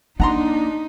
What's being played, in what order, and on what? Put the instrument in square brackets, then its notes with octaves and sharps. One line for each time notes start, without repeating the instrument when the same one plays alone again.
[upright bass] A#3 [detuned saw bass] D4 [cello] D#4 [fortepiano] F#5 A#5 C6